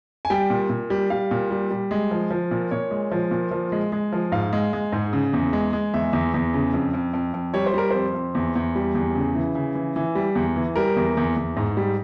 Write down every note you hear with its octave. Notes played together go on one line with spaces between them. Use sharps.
G#5
G3 G5
A#2
A#2
G3
G3 F5
A#2
G3
G3
G#3
F3
F3
A#2
A#2 C#5
G#3
F3
A#2
F3
G#3
G#3
F3
G#2 F5
G#3
G#3
G#2
C#3
E2
G#3
G#3
E2 E5
E2
E2
C#3
F2
F2
F2
F2
G3 C#5
C5
G3 A#4
F2 C5
F2
E2
E2
G3
E2
C#3
E3
C#3
E3
E3
G3
E2
E3
G3 A#4
E2
E2
E2
G#2
G3